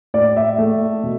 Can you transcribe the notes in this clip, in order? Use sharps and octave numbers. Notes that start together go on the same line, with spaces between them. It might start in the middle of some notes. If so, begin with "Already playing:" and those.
A2 D5
E5
A3
B2